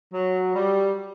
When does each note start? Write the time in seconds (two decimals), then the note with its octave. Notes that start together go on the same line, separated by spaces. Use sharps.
0.12 F#3
0.54 G3